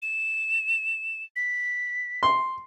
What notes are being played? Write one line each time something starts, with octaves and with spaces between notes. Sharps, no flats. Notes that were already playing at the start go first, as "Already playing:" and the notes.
E7
B6
C6